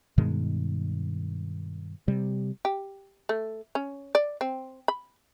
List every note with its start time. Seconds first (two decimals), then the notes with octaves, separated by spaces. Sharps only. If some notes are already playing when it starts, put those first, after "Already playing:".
0.18 G2 B2 D#3 G#3
2.08 C3 G3
2.65 G4
3.29 A3
3.75 C#4
4.15 D5
4.41 C4
4.88 B5